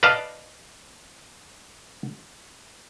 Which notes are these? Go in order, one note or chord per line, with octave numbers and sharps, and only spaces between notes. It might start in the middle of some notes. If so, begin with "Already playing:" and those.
B4 D5 D#5 F5 A5